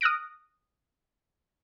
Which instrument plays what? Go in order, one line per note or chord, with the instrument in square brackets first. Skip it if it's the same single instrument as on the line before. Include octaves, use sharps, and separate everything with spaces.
[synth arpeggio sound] D#6 F6 F#6 A#6 D7